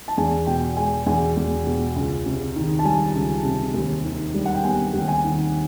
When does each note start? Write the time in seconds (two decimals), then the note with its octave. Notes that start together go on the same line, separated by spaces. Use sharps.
0.08 A5
0.17 E2 G#5
0.47 B2 G5
0.77 G#3 G#5
1.06 E2 G#5
1.37 E2
1.67 B2
1.96 C#2
2.26 C3
2.56 D#3
2.79 A5
2.85 G3 G#5
3.15 C#2
3.44 C3
3.74 D#2
4.05 D#3
4.34 G3
4.45 F#5
4.55 G5
4.64 B3 G#5
4.93 D#2 G5
5.08 G#5
5.24 D#3